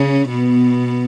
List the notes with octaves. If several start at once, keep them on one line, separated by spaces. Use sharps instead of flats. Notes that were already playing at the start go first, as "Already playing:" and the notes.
Already playing: C#3 C#4
B2 B3